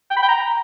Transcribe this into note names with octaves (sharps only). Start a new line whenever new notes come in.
G5
B5
G5
A#5